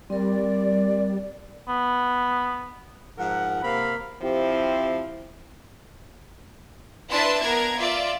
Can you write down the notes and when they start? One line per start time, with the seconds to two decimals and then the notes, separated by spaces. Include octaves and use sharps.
0.10 G3 C4 A#4 D5
1.68 B3
3.18 G#2 F3 A#4 F#5
3.63 C3 A#3 C4 A#4 F5 B5
4.22 F3 C4 E4 G4
7.10 D4 E4 B4 E5 A5 C6
7.40 B3 D4 A#4 G#6
7.77 F4 D5 E5